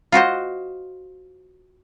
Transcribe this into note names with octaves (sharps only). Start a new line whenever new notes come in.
F4 F#4 C5 D#5